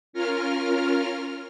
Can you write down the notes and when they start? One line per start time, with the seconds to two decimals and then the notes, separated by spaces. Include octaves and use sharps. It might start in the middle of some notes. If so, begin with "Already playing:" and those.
0.13 C#4 F4 A#4 F6